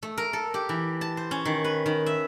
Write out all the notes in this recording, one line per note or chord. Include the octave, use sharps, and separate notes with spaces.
A3
A#4
A4
G4
E3
A5
C5
C#4
D#3
B4
D#3
E5